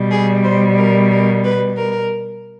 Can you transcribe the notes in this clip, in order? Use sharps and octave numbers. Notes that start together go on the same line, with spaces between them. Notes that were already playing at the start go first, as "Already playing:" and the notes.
Already playing: B2 G3
G#4
C5
A#4
A#4
B4
A#4